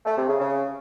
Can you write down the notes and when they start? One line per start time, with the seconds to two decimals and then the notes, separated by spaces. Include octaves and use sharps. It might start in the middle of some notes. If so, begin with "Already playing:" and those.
0.05 A3
0.17 C3
0.28 C#3
0.39 C#3